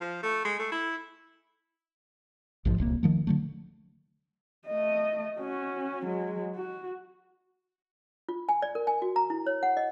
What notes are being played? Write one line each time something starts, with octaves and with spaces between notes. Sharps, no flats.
F3
A3
G#3
A3
E4
A#1 G#2 F3
D1 C2 A#2 A#3
D#3 F3 A3
D3 F#3 A3
A3 D#5
C#4 F#4
F#3 G#3
F#4
F4
G#5
D5
A#4
G#5
F#4
A#5
E4
C#5
F#5
D#5